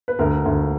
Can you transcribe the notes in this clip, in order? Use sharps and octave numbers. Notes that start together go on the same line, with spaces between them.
B4
D2 A#4
D2